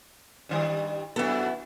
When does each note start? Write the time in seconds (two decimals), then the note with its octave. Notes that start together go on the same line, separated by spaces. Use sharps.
0.49 G2 D#3 G3
1.16 F#2 B3 E4 F#4 A4